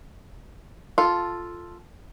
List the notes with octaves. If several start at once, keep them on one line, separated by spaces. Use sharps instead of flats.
F4 A4